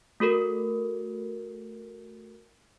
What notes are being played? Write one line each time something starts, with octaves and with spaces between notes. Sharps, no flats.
A3 F#4 A4 A#4